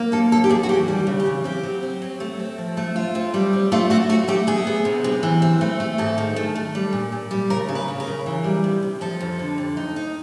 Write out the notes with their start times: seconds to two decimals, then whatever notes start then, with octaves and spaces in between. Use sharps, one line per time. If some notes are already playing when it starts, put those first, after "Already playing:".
Already playing: A#3
0.12 D#2 A4
0.31 D#2 A4
0.44 G4
0.49 D#2 G#4
0.63 F#4
0.69 E3 G4
0.88 G3
1.07 C#3
1.20 G4
1.26 E3
1.44 C4 G4
1.63 F#3
1.83 C4
2.02 F#3
2.20 A3
2.40 C4
2.58 F3
2.77 A3
2.96 F4
3.15 C4
3.34 G3
3.53 C4
3.72 A3 F4
3.90 A3 F#4
4.09 A3 F#4
4.28 A3 G4
4.47 B3 G#4
4.67 B3
4.85 C3
5.04 C3
5.23 E3
5.42 C4
5.61 A3
5.80 A3
5.98 G#2 A4
6.18 D#3
6.36 A3
6.56 A3
6.75 G3
6.93 A#2
7.12 A#2
7.31 G3
7.50 C#3 A#4
7.69 C#3
7.75 B4
7.88 C#3
8.00 A#4
8.07 C#3
8.26 E3
8.44 G3
8.64 C3
8.83 C3
9.01 F3 A4
9.20 F2
9.39 D3
9.58 F2
9.77 D#4
9.96 D#4